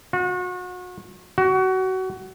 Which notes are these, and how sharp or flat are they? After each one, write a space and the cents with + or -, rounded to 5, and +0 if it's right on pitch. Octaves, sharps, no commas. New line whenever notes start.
F#4 -35
F#4 +25